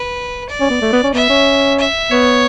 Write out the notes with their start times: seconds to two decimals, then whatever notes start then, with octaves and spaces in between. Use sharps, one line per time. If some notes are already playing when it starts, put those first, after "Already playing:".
Already playing: B4
0.49 D5
0.60 C#4
0.70 B3
0.81 A3
0.93 B3
1.03 C#4
1.14 B3 E5
1.30 C#4
1.79 E5
2.11 B3 C#5